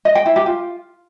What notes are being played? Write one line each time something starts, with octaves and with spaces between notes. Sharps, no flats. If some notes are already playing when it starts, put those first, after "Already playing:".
D#5
G5
E4
G4
F4